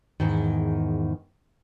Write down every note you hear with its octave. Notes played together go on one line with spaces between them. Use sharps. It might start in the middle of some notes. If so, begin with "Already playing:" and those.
E2 G#2 D#3